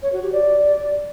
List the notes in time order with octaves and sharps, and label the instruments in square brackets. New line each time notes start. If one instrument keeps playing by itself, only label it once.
[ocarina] C#5
F#4
G4
D5